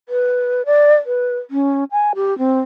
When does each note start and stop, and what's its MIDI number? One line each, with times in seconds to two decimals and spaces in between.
0.09 0.62 71
0.66 0.95 74
1.06 1.37 71
1.50 1.84 61
1.91 2.12 80
2.15 2.37 67
2.38 2.60 60